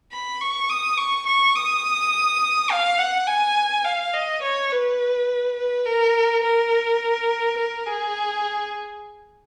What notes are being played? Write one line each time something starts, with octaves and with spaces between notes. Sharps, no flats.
B5
C#6
D#6
C#6
C#6
D#6
F5
F#5
G#5
F5
D#5
C#5
B4
B4
A#4
A#4
A#4
G#4